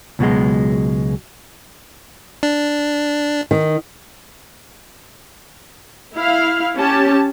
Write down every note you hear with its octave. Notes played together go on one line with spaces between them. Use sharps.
C#2 B2 F#3 G#3
D4
D#3
E4 F5
C#4 G4 A5